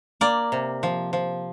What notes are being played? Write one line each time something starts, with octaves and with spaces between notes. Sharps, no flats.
A#3 D5
C3
F3
F3